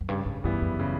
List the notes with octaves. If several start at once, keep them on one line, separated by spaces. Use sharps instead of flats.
F#2
G2 C#3
G#2
G2 E3 G3 B3 E4
F#2
C#3